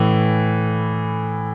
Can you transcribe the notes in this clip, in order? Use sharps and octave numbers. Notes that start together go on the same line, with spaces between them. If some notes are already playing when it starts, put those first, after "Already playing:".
Already playing: A2 E3